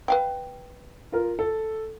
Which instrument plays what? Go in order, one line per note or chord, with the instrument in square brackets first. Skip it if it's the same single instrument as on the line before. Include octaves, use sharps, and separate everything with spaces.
[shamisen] B4 F5 G5
[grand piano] F4 A#4
A4